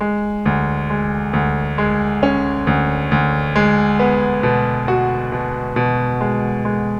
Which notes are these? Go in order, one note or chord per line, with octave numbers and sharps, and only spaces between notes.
G#3
D2
G#3
D2
G#3
C#4
D2
D2
G#3
B3
B2
F#4
B2
B2
G#3
G#3